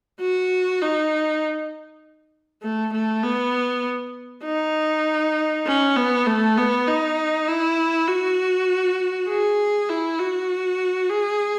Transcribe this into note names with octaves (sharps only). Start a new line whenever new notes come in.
F#4
D#4
A3
A3
B3
D#4
C#4
B3
A3
B3
D#4
E4
F#4
G#4
E4
F#4
G#4